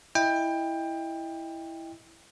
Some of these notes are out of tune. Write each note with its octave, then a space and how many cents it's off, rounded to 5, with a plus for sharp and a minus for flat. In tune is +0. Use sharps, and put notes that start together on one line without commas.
E4 +0 D#5 +0 G5 +20